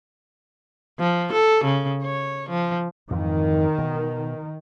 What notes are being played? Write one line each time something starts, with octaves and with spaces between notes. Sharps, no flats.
F3
A4
C#3
C#5
F3
F2 G#2 D#3 E3
B2